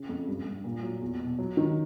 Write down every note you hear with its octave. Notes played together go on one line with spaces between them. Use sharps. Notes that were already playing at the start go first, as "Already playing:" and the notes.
Already playing: C#3
F2
G2
G2
A#2
F#3
E2
B2
F#3
D#3